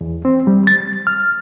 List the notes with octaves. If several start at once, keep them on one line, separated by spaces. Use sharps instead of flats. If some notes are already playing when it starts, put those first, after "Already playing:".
E2
C4
G3
A6
F6